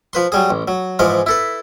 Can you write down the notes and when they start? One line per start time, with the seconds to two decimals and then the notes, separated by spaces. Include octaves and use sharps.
0.13 F3 B4 C6
0.32 F#3 G3 G#4
0.50 A1
0.68 F#3
0.99 G#2 E3 F3 G#4 F5
1.26 E4 A4 B4